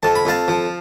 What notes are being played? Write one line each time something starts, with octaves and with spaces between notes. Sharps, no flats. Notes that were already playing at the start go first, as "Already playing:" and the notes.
F2 A5
B5
F2 F5 A5
F3